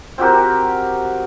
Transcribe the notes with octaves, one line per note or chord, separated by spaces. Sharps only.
C4 F#4 G4 A#4